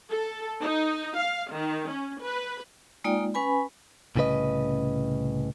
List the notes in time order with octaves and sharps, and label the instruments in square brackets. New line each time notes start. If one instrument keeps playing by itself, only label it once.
[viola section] A4
D#4
F5
D#3
C#4
B4
[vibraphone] G#3 A#3 D#4 F4 D5 G5
C#4 B4 G#5 B5
[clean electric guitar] C2 A2 C#3 C#4 B4 D#5